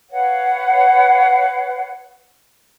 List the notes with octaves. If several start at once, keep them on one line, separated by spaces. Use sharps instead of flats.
B4 C#5 F5 F#5